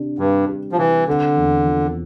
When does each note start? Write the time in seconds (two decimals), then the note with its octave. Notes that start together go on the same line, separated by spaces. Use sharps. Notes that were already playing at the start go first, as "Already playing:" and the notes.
Already playing: C3 D4 G4
0.18 G2 G3
0.48 G4
0.72 F3
0.78 C3 E3
1.07 D3 C4
1.37 E2
1.66 F3